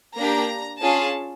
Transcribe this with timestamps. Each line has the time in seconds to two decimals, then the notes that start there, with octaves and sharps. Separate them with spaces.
0.17 A#3 D4 G4 A#5
0.81 C#4 F4 G#4 A5